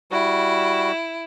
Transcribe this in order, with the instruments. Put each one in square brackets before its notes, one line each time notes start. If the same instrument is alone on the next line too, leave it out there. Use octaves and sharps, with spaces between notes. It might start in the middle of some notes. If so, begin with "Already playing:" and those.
[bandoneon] G3 F#4 [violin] E4